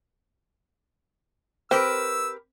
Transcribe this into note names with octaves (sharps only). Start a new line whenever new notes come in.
C4 G4 A#4 B4 E6